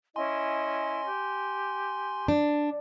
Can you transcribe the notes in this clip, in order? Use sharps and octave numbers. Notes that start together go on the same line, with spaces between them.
C#4 E4 D#5 G#5 C6
G4
D4